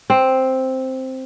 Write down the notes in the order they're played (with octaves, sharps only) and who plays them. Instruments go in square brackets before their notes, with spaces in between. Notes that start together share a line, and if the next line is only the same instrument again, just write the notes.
[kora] C4